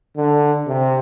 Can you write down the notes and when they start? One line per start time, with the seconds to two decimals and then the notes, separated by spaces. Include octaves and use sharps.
0.17 D3
0.67 C3